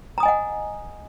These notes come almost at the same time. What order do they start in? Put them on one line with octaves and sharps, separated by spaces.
A#5 D#6 G#5 D#5 F#5